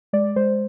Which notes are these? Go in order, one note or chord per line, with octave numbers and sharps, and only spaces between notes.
G#3 D5
G#3 C5